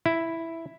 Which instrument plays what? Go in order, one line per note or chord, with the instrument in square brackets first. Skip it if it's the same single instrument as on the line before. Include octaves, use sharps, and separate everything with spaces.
[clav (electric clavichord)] E4